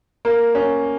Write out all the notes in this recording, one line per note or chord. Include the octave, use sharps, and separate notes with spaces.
A#3
C#4